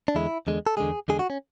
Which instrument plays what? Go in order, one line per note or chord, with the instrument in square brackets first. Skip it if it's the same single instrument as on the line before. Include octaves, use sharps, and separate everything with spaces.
[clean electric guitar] D4
E2 D3 G#3 E4
E2 D3 G#3
A4
E2 D3 G#3 G#4
E2 D3 G#3 G#4
F#4
C#4